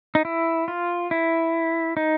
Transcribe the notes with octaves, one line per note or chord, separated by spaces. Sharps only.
D#4
E4
F4
E4
D#4